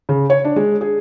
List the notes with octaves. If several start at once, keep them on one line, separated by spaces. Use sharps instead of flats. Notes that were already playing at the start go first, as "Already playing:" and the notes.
C#3
C#5
D4
G#3
G#4